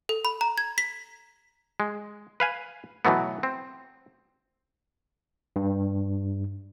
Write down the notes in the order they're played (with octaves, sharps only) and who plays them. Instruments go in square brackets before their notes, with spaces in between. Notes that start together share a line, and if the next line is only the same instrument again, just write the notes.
[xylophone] A4
B5
A#5
G#6
B6
[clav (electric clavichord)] G#3
B4 F5 G#5
B2 E3 F#3 A3 B3
C4
[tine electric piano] G2